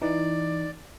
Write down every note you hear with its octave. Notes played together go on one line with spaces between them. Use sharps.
E3 D#4 D5